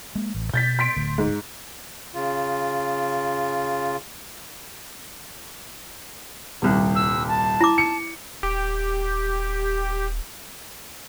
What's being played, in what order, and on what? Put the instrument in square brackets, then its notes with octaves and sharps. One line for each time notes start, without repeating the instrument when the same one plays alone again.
[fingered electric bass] G#3 A#3
A1
[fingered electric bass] B2 [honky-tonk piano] G6 A6 B6
[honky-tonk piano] C6 B6 D7
[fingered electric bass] D1 D2
[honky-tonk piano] G#2
[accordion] C#3 F4
[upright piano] D#1 C2
[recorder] E6
A5
[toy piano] E4 D6
[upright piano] C#7
[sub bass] D#1 [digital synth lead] G4